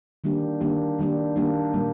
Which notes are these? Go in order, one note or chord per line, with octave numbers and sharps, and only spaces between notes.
D#3 G3 A#3 D4 G4
D#3 G3 A#3 D4 G4
D#3 G3 A#3 D4 G4
D#3 G3 A#3 D4 G4
A#2 G3 A#3